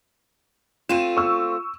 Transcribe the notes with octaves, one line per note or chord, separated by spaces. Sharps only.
A3 C4 F4 D#7 E7
C#6 E6